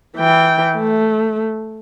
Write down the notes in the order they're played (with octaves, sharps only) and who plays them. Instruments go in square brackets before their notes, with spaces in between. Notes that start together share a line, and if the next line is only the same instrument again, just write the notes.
[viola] E3 G5
A3